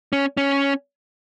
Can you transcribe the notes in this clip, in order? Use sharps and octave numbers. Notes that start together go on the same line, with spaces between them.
C#4
C#4